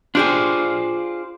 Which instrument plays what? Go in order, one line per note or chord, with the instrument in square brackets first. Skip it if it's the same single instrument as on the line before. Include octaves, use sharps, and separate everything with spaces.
[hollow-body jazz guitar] D4 G4 G#4 [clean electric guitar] F4 C5 D5